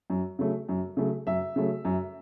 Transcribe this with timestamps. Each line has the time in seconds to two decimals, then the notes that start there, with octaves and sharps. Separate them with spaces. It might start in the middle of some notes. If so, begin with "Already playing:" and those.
0.10 F#2
0.39 C#3 F#3 A3
0.69 F#2
0.97 C#3 F#3 A3
1.27 F#2 E5
1.56 C#3 F#3 A3
1.85 F#2